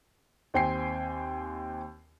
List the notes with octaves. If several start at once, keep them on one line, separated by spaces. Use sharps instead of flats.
D#2 C4 G5 G#5 C7